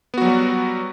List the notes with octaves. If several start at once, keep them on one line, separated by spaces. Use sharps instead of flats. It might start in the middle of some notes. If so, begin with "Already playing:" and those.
F#3 G3 B3 F#4